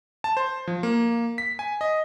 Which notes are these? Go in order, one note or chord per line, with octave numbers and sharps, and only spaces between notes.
A5
C5
F3
A#3
B6
G#5
D#5